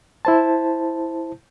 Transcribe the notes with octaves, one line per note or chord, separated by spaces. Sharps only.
E4 C5 A5